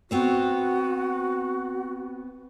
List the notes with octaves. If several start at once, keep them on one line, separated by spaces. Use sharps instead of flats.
B3 C4 F#4 C5